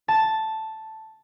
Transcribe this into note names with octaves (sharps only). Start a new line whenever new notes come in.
A5